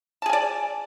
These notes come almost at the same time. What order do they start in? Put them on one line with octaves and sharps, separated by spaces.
A5 G#4 G#5 D5